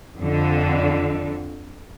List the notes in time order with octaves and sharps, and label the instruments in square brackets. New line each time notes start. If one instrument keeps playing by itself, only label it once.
[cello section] F2 D3